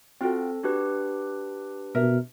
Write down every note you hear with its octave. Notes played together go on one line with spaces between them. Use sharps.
C4 F4 F#4 A4 G5
D4 F#4 G4 B4
B2 A#4 E5